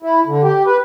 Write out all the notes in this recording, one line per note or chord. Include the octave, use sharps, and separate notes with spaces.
E4
D3
G4
B4